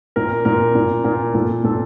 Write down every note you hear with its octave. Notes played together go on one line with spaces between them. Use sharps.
A#2 A#4
A#2 A#4
A#2
A#2 A#4
A#2 A4
A#2 A4